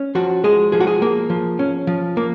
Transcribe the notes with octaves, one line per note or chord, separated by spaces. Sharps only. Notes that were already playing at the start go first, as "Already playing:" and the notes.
Already playing: C#4
F3 F#4
G#3 G#4
F3 G#4
F#4
G#4
A#3
F3
C#4
F3
A#3